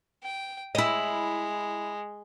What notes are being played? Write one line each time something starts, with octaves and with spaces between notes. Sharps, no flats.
G5
G#3 E4 D#5